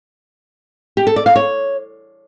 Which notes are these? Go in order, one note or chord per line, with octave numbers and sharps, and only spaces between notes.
G4
A4
D5
F5
C#5